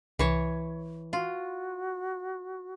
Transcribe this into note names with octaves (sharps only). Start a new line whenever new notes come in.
C2 E3 C#5
F4 F#4